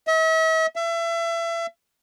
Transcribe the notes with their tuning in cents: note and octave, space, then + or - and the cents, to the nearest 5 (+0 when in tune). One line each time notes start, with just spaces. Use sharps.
E5 -45
E5 +30